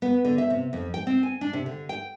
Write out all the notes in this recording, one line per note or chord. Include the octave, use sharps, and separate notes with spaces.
B3
D3
E5
C3
F2
G5
C4
G#5
D4
C3
D3
G5